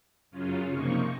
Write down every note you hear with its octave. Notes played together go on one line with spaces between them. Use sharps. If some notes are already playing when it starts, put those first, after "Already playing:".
F#2 C#3 F#3 C#4 F4
C3 F3 A#3 D#4 C#6